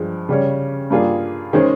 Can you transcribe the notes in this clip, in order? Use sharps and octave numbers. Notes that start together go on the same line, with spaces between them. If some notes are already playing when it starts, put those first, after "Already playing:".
Already playing: G2 F3 G#3
C#3 G3 C#4
G2 G3 A#3 F4 G#4
D#3 G#3 C#4 G#4 C5